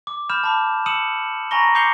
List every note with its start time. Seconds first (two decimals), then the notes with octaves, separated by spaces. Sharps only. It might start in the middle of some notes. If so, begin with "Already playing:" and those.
0.07 D6
0.30 B5 F6 G6 E7
0.44 A5 B5 D6
0.86 D#6 E6 C#7 D#7 E7 F#7
1.51 G#5 A#5 B5 C#6 A#6 G7
1.75 D6 G6 C7 C#7 F7 G7